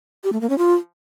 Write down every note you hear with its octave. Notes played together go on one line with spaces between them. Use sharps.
G4
A3
A#3
C#4
F4